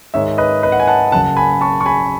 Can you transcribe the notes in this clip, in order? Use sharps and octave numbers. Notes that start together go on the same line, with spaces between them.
G#2 D#3 G#3 C#5 E5
B4 D#5
B4 D#5
F#5
G#5
F#5 A5
F#1 F#2 C#3 F#5 A5
G#5 B5
A5 C#6
C#6
G#5 B5